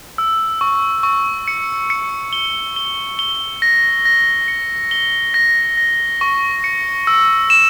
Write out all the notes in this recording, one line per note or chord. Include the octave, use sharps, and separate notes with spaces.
E6
C#6
C#6
C#7
C#7
G7
G7
G7
A#6
A#6
C#7
G7
A#6
A#6
C#6
C#7
E6
E7